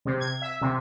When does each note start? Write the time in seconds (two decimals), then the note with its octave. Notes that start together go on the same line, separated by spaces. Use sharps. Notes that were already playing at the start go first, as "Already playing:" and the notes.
0.05 C3
0.20 G#6
0.42 E5
0.61 C3